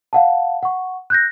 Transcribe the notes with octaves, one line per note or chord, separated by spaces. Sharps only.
F5 F#5 A5
F#5 C#6
F#6 G6 A#6